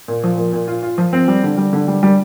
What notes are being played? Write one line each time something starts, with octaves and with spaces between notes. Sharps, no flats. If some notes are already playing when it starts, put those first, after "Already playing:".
A#2
F3
A#2
A#2
F4
F4
F3
C4
G3
D3
G3
D3
G3
G3